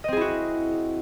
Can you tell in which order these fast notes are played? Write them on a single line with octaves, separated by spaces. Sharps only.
D#5 C4 G#4 E4 F#4